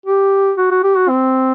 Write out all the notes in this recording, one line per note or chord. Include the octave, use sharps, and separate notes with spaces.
G4
F#4
F#4
G4
F#4
C4